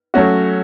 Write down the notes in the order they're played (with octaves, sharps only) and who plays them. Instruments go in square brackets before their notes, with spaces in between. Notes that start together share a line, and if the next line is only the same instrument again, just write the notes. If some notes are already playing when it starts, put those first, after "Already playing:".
[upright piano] F#3 A3 C#4 F#4